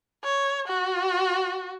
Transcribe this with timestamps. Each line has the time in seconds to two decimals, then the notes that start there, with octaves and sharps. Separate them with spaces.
0.24 C#5
0.67 F#4